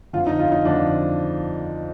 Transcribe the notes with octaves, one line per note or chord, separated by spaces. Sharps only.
F2 D3 F4
D#4
F4
D#4
F2 D3 D4